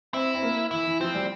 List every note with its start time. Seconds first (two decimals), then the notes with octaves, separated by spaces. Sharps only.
0.13 C4 E4
0.35 C4
0.42 A#3
0.71 E3 E4
0.86 E3
1.00 F3 C4
1.15 G3